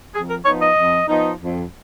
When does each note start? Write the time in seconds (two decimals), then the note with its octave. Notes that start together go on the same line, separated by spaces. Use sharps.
0.14 F2 G#4
0.29 A#4
0.45 F3 B3 D#4 C#5
0.61 D#5
0.76 F2
1.07 F3 B3 D#4
1.39 F2